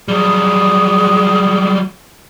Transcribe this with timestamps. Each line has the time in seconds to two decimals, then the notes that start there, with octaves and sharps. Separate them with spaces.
0.08 F#3 G3 G#4